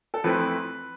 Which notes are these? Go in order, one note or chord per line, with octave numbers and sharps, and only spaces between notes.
A4
F2 E3 A3 C4 B4